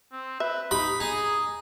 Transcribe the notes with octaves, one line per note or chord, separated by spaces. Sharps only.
C4
B4 E5
D#4 G4 B5
D#4 G#4